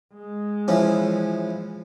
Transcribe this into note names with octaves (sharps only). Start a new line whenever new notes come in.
G#3
E3 F3 C#4